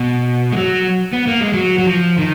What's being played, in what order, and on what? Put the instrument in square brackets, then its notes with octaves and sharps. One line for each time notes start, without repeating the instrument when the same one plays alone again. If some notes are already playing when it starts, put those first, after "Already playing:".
Already playing: [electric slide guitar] B2
G#3
F#3
B3
A#3
G#3
F#3
F#3
F3
D#3